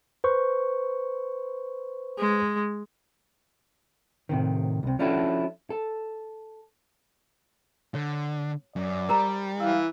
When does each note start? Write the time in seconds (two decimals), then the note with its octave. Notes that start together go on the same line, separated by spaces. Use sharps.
0.24 B4 C5 C#6
2.18 G#3
4.29 A2 C3 D#3
4.83 C2 C3
4.99 F3 C#4 D4 E4 F#4 A4
5.70 A4
7.95 D3 C#5
8.76 F#2 D5
9.09 G3 A#4 C5 A#5
9.60 E3 F5 E6